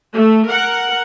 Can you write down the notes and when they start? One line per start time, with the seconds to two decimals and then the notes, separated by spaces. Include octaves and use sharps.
0.12 A3
0.48 A#4 F#5